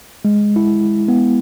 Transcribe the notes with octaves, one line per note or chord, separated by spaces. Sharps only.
G#3
E4
B3